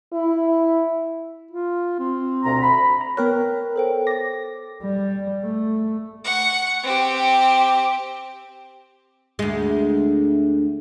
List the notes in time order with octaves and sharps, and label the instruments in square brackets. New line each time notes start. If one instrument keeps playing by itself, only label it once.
[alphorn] E4
[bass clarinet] F4
C4
[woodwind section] D2 B2 A#5
B5
[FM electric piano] A#5
[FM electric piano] B3 A#4 C#5 [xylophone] G5 F6 F#6
[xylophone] A4 C5 G5
[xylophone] D6 A6 [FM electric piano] A#6
[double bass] G3
A3
[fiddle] F#5 C#6
C4 G4
[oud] D2 G#3